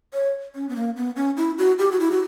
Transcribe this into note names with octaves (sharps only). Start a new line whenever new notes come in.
C#5
C#4
B3
A#3
B3
C#4
E4
F#4
G4
F#4
E4
F#4